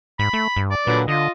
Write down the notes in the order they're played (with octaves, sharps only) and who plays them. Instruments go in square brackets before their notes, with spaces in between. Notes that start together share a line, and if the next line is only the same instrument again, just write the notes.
[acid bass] G#2 [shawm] B5
[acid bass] A3
G2
[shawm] D5
[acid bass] A#2 [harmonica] D3 F#3 B4
[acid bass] D3 [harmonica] F4 [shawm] D#5